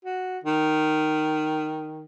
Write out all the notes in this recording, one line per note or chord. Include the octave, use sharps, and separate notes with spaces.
F#4
D#3